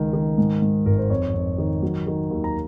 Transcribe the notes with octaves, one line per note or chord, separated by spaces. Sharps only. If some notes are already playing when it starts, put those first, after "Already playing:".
Already playing: C#2 D#3
D#3
G#2
G#2
G#1 A#4
C5
F2 C#5
F2
D#3
F#3
D#3
D#2
A#5